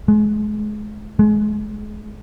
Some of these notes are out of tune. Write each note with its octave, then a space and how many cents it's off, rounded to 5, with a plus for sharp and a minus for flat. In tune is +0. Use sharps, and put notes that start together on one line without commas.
G#3 +30
G#3 +25